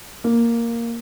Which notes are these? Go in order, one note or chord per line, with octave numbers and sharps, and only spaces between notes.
A#3